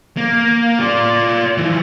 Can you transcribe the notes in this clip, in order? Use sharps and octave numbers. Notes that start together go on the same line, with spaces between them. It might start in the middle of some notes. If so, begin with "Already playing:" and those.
A#3
F4 D5
E3 F3